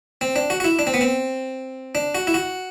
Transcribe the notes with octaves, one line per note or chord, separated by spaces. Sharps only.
C4
D4
F#4
F#4
E4
D4
C4
B3
C4
D4
F#4
E4
F#4